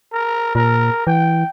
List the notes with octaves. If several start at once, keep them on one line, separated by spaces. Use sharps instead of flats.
A#4
A#2 A#4
E3 G5